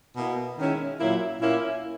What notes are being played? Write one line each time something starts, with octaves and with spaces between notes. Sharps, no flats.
B2 A#3 E4
D#3 G#3 C#4 E4
A#2 F#3 A#3 E4
A#2 A#3 C#4 E4